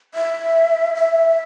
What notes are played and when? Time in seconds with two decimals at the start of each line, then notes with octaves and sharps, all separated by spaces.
0.14 E5
0.95 E5